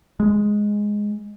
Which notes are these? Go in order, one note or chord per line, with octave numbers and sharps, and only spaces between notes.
G#3